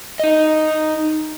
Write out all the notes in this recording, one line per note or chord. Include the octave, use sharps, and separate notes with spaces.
D#4 D#5